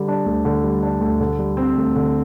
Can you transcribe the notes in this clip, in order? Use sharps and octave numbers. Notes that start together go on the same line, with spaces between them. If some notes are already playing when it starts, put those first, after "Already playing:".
Already playing: D3 G3
D4
D2
D3
G3
D4
D2
D3
G3
C4
D2
D3